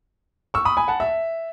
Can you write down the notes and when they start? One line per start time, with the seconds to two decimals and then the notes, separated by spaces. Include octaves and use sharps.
0.54 C#6 E6
0.65 B5 D#6
0.77 G#5 B5
0.88 F#5 A5
1.00 E5